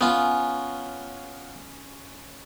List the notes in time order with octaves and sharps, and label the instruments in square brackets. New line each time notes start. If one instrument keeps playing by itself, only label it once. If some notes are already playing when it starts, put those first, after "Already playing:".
[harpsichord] B3 F4 [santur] C#4